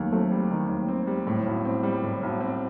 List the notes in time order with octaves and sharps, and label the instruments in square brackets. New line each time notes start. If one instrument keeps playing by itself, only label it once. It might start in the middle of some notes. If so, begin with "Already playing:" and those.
Already playing: [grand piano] D#2 D#3 [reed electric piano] F#3 A3
[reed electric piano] F#3 A3 [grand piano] C4
[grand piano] G3
D#3
D#2
C4
G3
A2
B1
C4
G3
A2
B1
C4